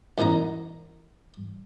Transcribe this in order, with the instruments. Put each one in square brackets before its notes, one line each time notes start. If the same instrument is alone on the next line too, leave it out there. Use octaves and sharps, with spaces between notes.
[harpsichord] F#2 B2 E3 D#4 A#5